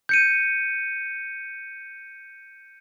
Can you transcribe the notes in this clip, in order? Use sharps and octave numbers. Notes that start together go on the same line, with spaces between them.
G6 C#7 D#7